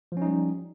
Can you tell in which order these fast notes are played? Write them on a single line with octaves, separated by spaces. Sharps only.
F3 C#4 D#4 G3